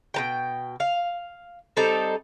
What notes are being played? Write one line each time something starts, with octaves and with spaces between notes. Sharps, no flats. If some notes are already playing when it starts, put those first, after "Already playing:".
B2 B3 G5
F5
G3 C4 D#4 A4